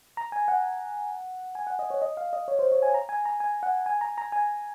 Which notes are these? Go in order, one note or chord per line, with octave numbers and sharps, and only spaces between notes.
A#5
G#5
F#5
G#5
F#5
D#5
C#5
D#5
F5
D#5
C#5
C5
C#5
G#5
A#5
G#5
A#5
G#5
F#5
G#5
A#5
A#5
G#5